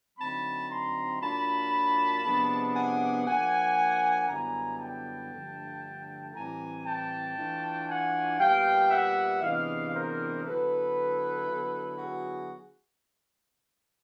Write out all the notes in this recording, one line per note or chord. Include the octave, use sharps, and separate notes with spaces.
D3 F#3 A3 C4 D#4 A5 B5
A#5 C6
A#2 F#3 A#3 D4 F4 A5 B5
C3 F3 G#3 B3 D4
F#5 G#5
F3 A#3 D4 F#5 G#5
F#2 D3 G3 B3 E4 G#5 A#5
G5 A5
G2 D3 F3 A3
A2 E3 G3 C4 E4 G#5 A#5
G5 A5
E3 A3 D4 F4
F#5 G#5
A#2 G3 B3 F5 G5
E5 F#5
C3 E3 G#3 B3 D4 D#5 F5
A#4 C5
D3 F#3 B3 E4 A4 B4
D3 F#3 B3 E4
F#4 G#4